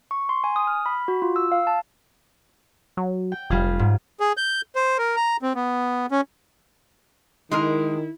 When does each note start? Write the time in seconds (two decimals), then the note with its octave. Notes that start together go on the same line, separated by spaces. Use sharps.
0.11 C#6
0.29 C6
0.44 G#5
0.56 D#6
0.67 F6
0.86 B5
1.08 F#4
1.22 F4
1.36 E6
1.52 F5
1.67 A5
2.97 F#3
3.32 G5
3.50 F1 G3 F4 G#4
3.79 G#2
4.20 G#4
4.37 G6
4.76 C5
4.98 A#4
5.16 A#5
5.42 C4
5.55 B3
6.11 C#4
7.52 D#3 G#3 E4 G#4 A#4